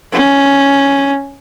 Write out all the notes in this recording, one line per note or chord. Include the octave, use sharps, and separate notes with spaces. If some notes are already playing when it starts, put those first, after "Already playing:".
C#4